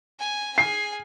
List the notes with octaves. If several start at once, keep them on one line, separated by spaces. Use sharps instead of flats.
G#5
G#4 G#5 C7